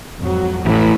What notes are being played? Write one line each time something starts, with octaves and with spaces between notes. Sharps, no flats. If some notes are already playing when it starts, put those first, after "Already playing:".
F2 G#2 F#3
A1 A2 E4 B4